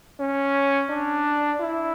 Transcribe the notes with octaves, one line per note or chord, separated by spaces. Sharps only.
C#4
D4
E4